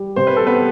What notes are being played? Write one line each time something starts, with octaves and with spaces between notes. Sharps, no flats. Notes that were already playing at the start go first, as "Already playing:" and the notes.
Already playing: G3
C3 C5
B4
G3 A4
B3 B4